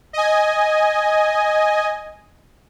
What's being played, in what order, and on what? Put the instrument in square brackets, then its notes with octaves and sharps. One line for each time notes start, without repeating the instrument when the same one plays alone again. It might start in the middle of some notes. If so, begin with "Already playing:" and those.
[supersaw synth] D#5 G#5